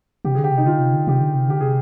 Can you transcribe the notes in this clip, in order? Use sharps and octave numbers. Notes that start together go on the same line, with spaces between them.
C3 G4
D3 G#4
G4
C3
D#4
D3 F4
C3
D3
C3 G4
D3
C3
D3 G4
C3 G#4